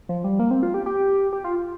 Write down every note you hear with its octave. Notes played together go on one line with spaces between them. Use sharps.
F3
G3
A#3
C4
F4
G4
G4
G4
F4